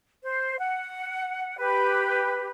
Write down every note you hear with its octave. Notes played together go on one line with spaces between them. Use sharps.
C5
F#5
G4 B4